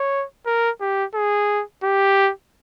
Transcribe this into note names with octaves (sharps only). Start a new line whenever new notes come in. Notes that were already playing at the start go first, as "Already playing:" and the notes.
Already playing: C#5
A#4
G4
G#4
G4